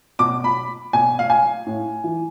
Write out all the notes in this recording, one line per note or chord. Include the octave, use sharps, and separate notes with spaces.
B2 D6
B5
B2 G#5
F5
G#5
A2
E3